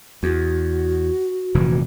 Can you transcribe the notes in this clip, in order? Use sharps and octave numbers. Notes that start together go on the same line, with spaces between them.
E2 F#4
F1 A#2 E3